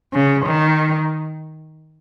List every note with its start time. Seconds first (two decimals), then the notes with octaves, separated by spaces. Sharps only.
0.13 C#3
0.46 D#3